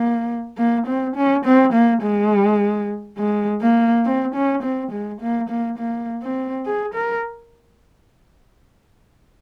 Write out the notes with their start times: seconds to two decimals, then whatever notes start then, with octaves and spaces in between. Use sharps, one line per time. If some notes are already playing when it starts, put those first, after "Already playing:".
Already playing: A#3
0.58 A#3
0.87 C4
1.16 C#4
1.45 C4
1.73 A#3
2.03 G#3
3.18 G#3
3.62 A#3
4.05 C4
4.35 C#4
4.63 C4
4.92 G#3
5.21 A#3
5.50 A#3
5.79 A#3
6.23 C4
6.66 G#4
6.95 A#4